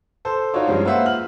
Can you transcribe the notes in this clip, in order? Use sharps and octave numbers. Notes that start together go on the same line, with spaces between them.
A4 C5
D#4 F4 F#4 C#5 D5
G2 F3 G3 G#3 C#4
A#3 F4 B4 C5 E5 F#5
F6 F#7